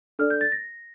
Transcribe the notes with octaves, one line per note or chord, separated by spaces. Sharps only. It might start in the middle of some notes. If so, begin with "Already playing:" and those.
D4 A4 D5 F6
G6
A6
A#6